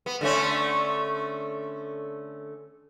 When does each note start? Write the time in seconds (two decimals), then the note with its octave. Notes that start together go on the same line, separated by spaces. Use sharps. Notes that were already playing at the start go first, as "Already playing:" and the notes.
0.06 B3
0.21 D3 A3 C#4